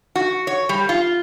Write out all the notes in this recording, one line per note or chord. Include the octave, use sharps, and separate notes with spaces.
F#4
C#5
G3
F4